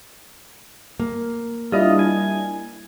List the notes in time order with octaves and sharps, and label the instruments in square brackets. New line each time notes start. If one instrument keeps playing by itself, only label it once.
[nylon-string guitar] A#3
[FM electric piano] G3 D4 E4 [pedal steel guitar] F4 D#5
[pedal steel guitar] G#5